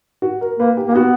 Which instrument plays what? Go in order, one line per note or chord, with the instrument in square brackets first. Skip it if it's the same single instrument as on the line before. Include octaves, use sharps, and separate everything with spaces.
[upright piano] F#4
A#4
[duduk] A#3 [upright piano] B4
[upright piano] G4
[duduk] A#3 [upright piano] G4
[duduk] B3 [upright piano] F#4